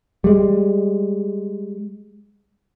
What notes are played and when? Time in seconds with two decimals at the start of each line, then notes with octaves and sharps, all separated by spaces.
0.24 G3 G#3